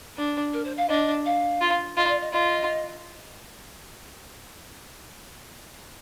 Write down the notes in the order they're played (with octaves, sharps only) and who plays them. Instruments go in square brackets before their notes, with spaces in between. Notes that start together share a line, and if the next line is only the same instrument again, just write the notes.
[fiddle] D4
[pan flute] A#4
C5
F5
[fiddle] D4 [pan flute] D#5
[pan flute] F5
[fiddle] F4
[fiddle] F4 [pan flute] D#5
[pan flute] D5
D#5
[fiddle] F4 [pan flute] D#5